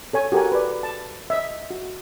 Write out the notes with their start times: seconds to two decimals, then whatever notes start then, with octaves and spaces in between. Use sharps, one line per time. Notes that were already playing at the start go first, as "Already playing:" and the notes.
0.13 A4 C#5 G#5
0.32 F#4 G4 A4 A#4 G#5
0.52 B4 D5
0.83 A5
1.30 D#5 E5
1.70 F#4